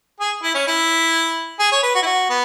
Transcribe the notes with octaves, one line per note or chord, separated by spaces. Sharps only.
G#4
E4
C#4
E4
G#4
C#5
B4
F#4
E4
F#4
B3